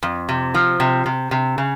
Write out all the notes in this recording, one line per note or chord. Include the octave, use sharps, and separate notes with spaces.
F2
C3
F3
C3
C3
C3
C#3